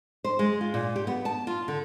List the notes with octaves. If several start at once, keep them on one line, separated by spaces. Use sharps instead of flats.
C5
G#3
F4
A#2
G4
B3
A5
F4
D3